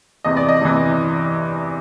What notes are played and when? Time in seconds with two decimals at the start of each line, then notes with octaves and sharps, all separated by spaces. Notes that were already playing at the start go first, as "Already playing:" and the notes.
0.24 E2 C3 E3 D#5
0.37 D5
0.49 D#5
0.61 E2 C3 E3